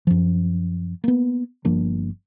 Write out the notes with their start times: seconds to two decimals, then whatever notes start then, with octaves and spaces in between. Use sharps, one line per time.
0.07 F#2 F3
1.04 A#3 B3
1.65 G1 F3 A#3 D4